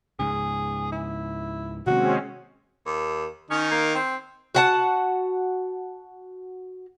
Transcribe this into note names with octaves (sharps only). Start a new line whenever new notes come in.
C#2 G#2 C#3 G#4
E4
C3 D#3 G#3 A#3 C4 C#4 F#4
D#2
D#3 C#4 D#4
A#3
C4
F#4 F#5 A5